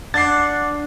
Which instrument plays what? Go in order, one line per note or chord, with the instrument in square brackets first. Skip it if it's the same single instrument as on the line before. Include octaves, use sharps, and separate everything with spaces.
[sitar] D4 [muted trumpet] F#5 [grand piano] A6 C7